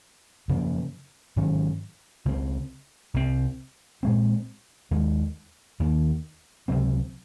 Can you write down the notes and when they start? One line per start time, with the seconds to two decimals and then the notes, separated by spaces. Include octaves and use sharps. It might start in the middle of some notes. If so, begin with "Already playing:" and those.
0.48 F#2 C#3 F3 A#3
1.36 G#2 D#3 F#3 C#4
2.25 C#2 C#3 F#3 C4
3.14 C2 C3 F3 C4
4.03 A#2 G#3 C4
4.91 D#2 D#3 G#3
5.80 D#2 D#3 A#3
6.68 C#2 C3 F#3 C4